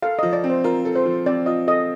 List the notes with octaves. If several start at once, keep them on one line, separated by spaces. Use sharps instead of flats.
A4 F5
D#5
F3
D5
C4
C5
F4 A#4
A4
C5
F3
C4 D5
F4 D#5
A4 D#5